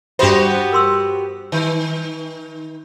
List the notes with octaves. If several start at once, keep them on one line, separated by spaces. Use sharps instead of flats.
G2 B3 F#4 G4 C5 E5 B5 C6
A#4 C6 E6
D#3